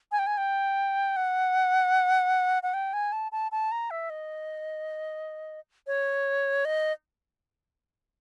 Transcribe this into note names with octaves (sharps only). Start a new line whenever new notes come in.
G#5
G5
G#5
G5
F#5
F#5
G5
G#5
A5
A5
A5
A#5
E5
D#5
C#5
D#5